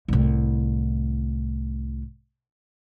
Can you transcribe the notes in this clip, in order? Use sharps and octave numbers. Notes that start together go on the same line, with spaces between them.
C2 A2